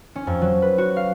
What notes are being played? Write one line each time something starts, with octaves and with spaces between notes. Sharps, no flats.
C#4
F2
F#3
B4
F#4
F5